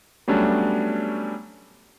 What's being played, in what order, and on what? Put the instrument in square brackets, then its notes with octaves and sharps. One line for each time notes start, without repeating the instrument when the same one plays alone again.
[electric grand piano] F#3 G3 A3 B3 C#4 D4